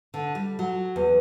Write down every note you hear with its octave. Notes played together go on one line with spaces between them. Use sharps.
D3
G3
F#3
E2